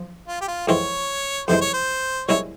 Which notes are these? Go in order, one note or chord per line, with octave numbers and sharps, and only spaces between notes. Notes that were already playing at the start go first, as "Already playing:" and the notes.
Already playing: F3
F4
G4
F4
F2 E3 G#3 C4 F4 C#5
F2 C3 E3 G#3 C5
C#5
C5
C2 A#2 G#3 C#4 E4 C#5